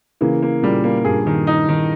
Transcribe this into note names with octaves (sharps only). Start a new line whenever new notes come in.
C#3 E3 A#3
A#3
A#2 C#3 G3
A#3
G2 A#2 G#4
D#3
D#4
D#3